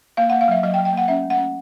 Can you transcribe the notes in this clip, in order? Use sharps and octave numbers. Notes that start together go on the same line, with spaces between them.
A#3 F5
A#3 F#5
F5
F#3 E5
F#3 D#5
G5
F#3
G5
A#3 F#5
C#4 E5
A3
F#5
C#4